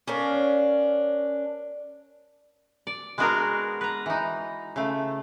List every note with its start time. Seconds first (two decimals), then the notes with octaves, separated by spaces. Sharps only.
0.08 C#4 D4 A#4 F5
2.87 D5
3.18 G#3 B3 D4 F#4 G#4 A#4
3.81 B4 A#5
4.06 E3 D#4
4.76 C#3 A3